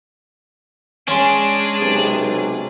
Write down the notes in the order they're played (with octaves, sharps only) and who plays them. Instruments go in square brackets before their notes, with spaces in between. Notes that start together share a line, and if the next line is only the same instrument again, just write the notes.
[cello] G#3 G#4 [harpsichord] C#4 G#5 C6 [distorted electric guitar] D4
[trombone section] B1 C3